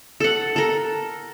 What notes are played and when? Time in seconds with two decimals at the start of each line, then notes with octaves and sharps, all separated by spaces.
0.20 A4 F#5
0.56 A4 A#4